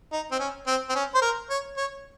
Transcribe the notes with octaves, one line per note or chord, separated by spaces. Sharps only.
D#4
C4
C#4
C4
C4
C#4
C5
A#4
C#5
C#5